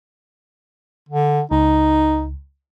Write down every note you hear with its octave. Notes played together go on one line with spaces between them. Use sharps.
D3
C#2 D#4